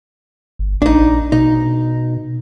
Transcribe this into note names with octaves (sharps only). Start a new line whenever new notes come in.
G1
A#1 D4 D#4
B2 D#4